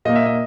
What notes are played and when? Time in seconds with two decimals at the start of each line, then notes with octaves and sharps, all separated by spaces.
0.05 A#2 A#3 D#5
0.16 E5
0.26 D#5